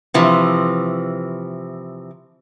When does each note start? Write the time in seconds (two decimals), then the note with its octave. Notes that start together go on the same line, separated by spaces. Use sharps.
0.14 C3 E3 F3